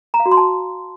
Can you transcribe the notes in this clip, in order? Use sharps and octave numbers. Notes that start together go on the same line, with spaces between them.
A#5
F5
F#4
C6
A5